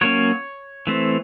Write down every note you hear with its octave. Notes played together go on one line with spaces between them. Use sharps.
F#3 A#3 C#4 C#5
E3 A3 C4